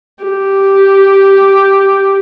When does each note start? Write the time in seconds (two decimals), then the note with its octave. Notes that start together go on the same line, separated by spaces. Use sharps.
0.24 G4